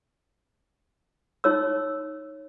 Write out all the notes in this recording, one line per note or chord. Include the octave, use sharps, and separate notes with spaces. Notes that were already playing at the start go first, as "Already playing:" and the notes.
D#4 C#5 E6